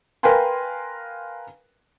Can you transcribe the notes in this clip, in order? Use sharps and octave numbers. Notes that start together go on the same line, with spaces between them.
A#4 B4 F5 G5 G#5 C6